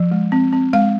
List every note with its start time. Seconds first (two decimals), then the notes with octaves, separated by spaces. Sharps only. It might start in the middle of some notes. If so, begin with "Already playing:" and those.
Already playing: F3
0.11 G#3
0.32 C4
0.53 C4
0.73 G#3 F5